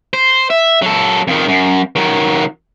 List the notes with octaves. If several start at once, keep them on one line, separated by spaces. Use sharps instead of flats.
C5
E5
F#3 A4
F2 D#3
F#2
D#3 F#3